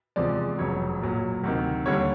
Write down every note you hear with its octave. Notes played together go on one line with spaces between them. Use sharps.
E2 C3 F3 G#3 D5
F1 F2 C#3 F#3 C#5
B1 A#2 F#3
D2 C3 D#3
D#2 D3 G3 C#5